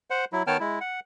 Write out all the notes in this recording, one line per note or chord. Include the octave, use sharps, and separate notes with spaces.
C5 F#5
F#3 E4
D#3 B3 C#5 G5 A5 F6
G#3 E4
F#5